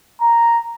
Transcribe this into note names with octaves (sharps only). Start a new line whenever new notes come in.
A#5